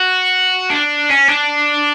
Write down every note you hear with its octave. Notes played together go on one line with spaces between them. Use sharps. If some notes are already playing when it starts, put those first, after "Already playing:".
Already playing: F#4
D4
C#4
D4